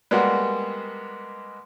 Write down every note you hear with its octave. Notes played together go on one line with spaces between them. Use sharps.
G3 G#3 A#3 B3 F#4